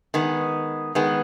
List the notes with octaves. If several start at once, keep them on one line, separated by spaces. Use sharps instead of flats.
D#3 G#3 B3
D#3 G#3 B3